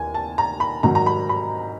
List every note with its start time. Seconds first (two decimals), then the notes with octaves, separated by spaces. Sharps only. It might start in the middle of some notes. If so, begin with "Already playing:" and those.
Already playing: D#2 E3 G#5
0.14 A5
0.38 A#5
0.60 B5
0.83 G#2 D#3 F#3 A#5
0.95 A#5
1.06 B5
1.29 B5